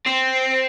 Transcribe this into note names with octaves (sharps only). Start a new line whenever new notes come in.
C4